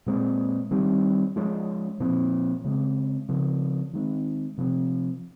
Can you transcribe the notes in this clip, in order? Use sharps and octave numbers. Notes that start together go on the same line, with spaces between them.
A#2 G#3 C4
D#3 G3 C4
F3 G#3 C#4
A#2 F3 C4
C#3 G#3 C4
C#3 F3 C4
D#3 G#3 C4
C3 F3 C4